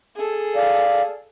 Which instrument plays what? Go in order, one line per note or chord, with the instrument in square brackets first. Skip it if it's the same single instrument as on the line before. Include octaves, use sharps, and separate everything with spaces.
[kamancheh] G#4 A4
[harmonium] D5 F5